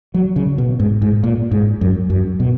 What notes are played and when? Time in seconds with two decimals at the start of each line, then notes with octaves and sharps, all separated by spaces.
0.14 F#3
0.36 C#3
0.58 B2
0.80 G#2
1.02 G#2
1.24 A#2
1.52 G#2
1.81 F#2
2.10 F#2
2.40 B2